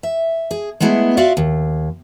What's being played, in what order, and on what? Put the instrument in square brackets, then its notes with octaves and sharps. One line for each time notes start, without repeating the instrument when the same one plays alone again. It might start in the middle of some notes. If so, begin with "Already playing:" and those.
[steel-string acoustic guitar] E5
G#4
G#3 A3 B3 E4 G#4
F4 F#4 D5 E5 F5
D#2